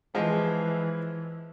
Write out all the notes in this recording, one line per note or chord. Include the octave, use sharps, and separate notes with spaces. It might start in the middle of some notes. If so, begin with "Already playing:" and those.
E3 F3 G#3